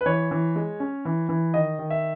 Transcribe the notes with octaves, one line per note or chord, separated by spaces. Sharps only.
B4
E3 C#5
E3
G#3
C#4
E3
E3
D#3 D#5
D#3
E5